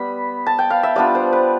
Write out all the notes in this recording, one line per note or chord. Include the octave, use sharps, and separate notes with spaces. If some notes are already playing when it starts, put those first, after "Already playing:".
Already playing: G3 B3 B5
A5
G5
F5
E5
G3 B3 D4 F4 D5
C5
B4